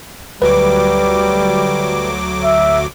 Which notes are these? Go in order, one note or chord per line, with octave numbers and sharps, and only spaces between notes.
D2 F#3 G3 B4 D6
E5